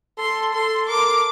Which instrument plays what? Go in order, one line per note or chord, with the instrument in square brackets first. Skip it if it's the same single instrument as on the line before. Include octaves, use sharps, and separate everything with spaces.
[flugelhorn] A4 [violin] C6
[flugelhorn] A4 [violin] C6
[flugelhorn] A#4 [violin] D6